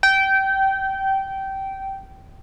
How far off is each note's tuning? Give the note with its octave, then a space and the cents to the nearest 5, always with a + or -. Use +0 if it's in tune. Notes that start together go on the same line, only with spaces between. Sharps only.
G5 -20